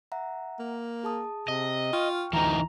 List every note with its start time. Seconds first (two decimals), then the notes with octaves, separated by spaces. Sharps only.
0.12 E5 F#5 A#5
0.59 A#3
1.04 G#4 A5 D#6
1.48 C3 D#5
1.93 F4 G5 C#6 F6
2.33 D2 E3 D#4 A#5